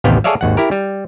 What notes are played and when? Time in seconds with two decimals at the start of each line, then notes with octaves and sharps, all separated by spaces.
0.04 A1 D#2 C3 B3 F5 G5
0.24 G#4 A4 C#5 D5 E5 F5
0.41 G#1 D#2 F#5
0.57 E4 G4 A#4
0.71 G3